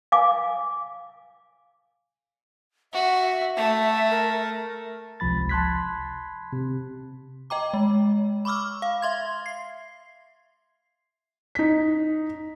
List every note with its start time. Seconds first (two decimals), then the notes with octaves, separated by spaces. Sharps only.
0.12 F5 G#5 D6
2.93 F#4 E5
3.56 A3 E5
4.11 A#4
5.20 G#1 C#2 C3 F3 B5 A6
5.49 A5 B5 C6 F#6 G#6 B6
6.53 C3
7.50 D#5 G5 A#5 D6
7.74 G#3
8.45 B5 C#6 D6 E6 F6
8.82 F5
9.02 E5 C6 G#6
9.46 C7
11.55 D#4 B6